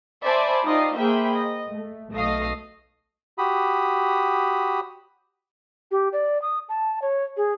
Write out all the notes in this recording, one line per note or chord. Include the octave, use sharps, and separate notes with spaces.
C5 D5 E5 G#5 A5 B5
D#4 F4 G4 D5 D#5 F5
A#3 G#4 C5 E5 G5 B5
D#5
A3
B1 A3 D#5 F5 D#6 A#6
F#4 G4 B5 D#6
G4
D5
D#6
A5
C#5
G#4